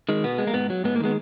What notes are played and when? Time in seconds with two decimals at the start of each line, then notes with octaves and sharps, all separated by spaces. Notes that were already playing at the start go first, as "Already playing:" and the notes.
0.09 D#3 G#3
0.24 B2 B3
0.38 G#3
0.47 A#3
0.53 G#2 B3
0.70 F#3
0.84 G#2 B3
0.95 A#3
1.00 D#3 G#3 B3